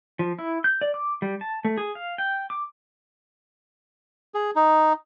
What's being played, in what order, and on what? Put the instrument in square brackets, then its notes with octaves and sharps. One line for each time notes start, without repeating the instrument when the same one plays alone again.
[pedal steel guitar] F3
E4
G6
D5
D6
G3
A5
A3
G#4
F5
G5
D6
[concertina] G#4
D#4